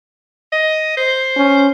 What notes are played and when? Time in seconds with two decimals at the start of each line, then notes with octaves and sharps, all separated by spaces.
0.52 D#5
0.97 C5
1.37 C#4